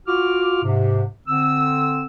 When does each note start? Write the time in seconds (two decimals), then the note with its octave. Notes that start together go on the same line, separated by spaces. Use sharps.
0.07 F4 F#4 D6 F6
0.63 G#2 C3
1.28 D3 C4 E6